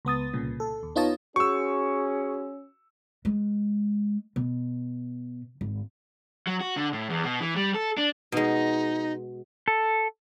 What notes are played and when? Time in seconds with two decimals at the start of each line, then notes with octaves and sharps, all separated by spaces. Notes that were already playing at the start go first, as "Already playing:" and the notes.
0.05 C#2 B3 D#6 A6
0.33 C2 A#2 C#3
0.60 A4
0.83 D#2
0.96 B3 D#4 F4 C#5 D#5 A5
1.36 C#4 F#4 G#4 C#6 E6
3.25 G#3
4.36 B2
5.61 G#1
6.47 F#3
6.60 F#4
6.77 D3
6.93 A2
7.10 E2
7.24 B2
7.41 E3
7.56 G3
7.75 A4
7.97 D4
8.32 B2 G#3 D#4
9.68 A4